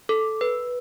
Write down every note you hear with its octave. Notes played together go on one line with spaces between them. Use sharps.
A4
B4